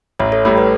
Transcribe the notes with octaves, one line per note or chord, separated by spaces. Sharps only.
A1 C#5 E5
A4 C#5
A2 G3 A4
B4